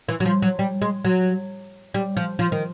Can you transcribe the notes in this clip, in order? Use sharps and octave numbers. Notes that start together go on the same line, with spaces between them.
E3
F#3
F3
F#3
G3
G#3
F#3
G3
F3
F3
D#3